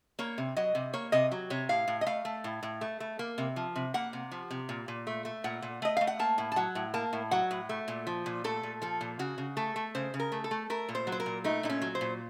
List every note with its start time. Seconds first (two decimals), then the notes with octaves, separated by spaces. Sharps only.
0.19 A#3 C#5
0.38 C3
0.57 F#3 D#5
0.75 C3
0.93 A#3 C#5
1.12 C3 D#5
1.31 F#3
1.50 C3 C#5
1.69 A2 F5
1.88 A2
2.01 D#5
2.06 A3 F5
2.25 A3
2.44 A2
2.63 A2
2.81 A3
3.00 A3
3.19 A#3
3.38 C3
3.56 F3
3.76 C3
3.94 A#3 F#5
4.13 C3
4.31 F3
4.51 C3
4.69 A#2
4.88 A#2
5.07 A3
5.25 A3
5.44 A#2 F#5
5.62 A#2
5.82 A3 D#5
5.97 A3 F5
6.07 F#5
6.19 A#3 A5
6.38 A2
6.52 A5
6.56 F#3 F#5
6.75 A2
6.94 A#3 A5
7.13 A2
7.31 F#3 F#5
7.51 A2
7.69 A3
7.88 A#2
8.07 F3
8.26 A#2
8.44 A3 A4
8.63 A#2
8.82 F3 A4
9.01 A#2
9.19 C#3 F#4
9.38 C#3
9.57 A3 A4
9.76 A3
9.95 C#3 C5
10.14 C#3
10.20 A#4
10.32 A3
10.44 A4
10.51 A3
10.70 A3 A#4
10.89 A#2
10.95 C5
11.07 F#3
11.12 C5
11.20 A#4
11.26 A#2
11.44 A3 D#4
11.63 A#2 D#4
11.70 C#4
11.82 F#3
11.95 C5
12.01 A#2